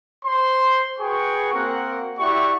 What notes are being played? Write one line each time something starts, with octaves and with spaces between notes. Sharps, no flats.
C5 C6
F#4 G#4 B4 G5 C#6
A#3 C4 F#4 A#4 F#5
E4 F#4 G4 D5 E5 C#6